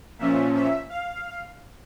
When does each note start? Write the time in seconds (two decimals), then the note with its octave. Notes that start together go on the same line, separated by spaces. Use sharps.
0.19 A#2 F3 C#4 E5
0.55 E5
0.90 F5